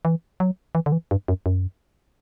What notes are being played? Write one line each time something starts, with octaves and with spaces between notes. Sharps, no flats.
E3
F#3
E3
D3
E3
G2
F#2
F#2